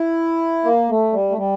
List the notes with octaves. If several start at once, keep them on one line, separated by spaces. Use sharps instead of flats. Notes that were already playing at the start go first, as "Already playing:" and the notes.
Already playing: E4
A#3
A3
G3
A3
G3